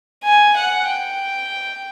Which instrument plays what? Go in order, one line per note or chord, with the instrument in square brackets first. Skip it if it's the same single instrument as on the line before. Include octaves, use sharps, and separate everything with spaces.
[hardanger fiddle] G#5
F#5
G5